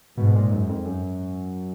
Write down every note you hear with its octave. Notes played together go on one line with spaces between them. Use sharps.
G#2 B2
A#2
F#2
F2
F#2